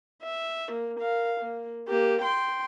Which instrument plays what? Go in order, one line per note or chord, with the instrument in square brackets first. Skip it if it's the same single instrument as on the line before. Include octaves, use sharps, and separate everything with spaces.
[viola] E5
A#3
A#4 F5
A#3
A#3 G4
G5 C6